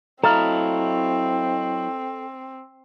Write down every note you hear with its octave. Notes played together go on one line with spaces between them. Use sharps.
F#3 C4 E4 A4 D#5 F5 A#5